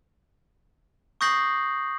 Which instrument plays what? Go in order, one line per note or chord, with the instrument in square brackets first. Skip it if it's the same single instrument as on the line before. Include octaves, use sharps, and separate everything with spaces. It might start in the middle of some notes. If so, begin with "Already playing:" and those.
[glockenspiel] C#6 D#6 G6 A#6 C7 F#7